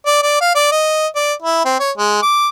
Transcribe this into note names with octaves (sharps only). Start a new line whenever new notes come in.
D5
D5
F5
D5
D#5
D5
E4
C4
C#5
G#3
D6